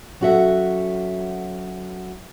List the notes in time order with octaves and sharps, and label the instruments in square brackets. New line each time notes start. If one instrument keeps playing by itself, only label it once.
[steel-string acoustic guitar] F#3 C#4 F#4 A4 E5 F#5